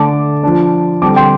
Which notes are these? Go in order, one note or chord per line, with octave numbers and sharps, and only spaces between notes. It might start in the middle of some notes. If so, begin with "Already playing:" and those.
Already playing: D3 A3 D4 A5 D6
F3 D4
D3 G3 C4 A5 D6
G5 C6